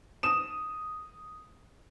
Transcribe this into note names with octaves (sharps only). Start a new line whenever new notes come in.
D#6 E7